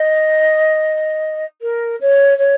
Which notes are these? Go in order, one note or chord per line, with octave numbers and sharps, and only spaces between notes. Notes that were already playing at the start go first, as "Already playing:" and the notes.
Already playing: D#5
A#4
C#5
C#5